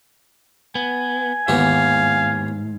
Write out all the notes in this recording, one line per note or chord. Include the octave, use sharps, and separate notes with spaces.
B3 G#5
D#2 G#2 E3 B3 F5